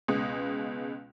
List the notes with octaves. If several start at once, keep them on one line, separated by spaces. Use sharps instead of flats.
C#2 B2 G#3 D#6